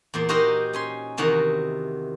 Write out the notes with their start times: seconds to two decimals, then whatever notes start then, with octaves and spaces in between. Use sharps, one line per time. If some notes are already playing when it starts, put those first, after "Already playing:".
0.14 E2 A#2 C5
0.29 D#4 F#4 G4 A#4 C5 D#5
0.73 C#4 G#5 C6
1.18 E2 C3 D#3 F#4 F#5 A#5